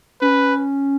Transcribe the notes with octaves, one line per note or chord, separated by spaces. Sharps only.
C#4 B4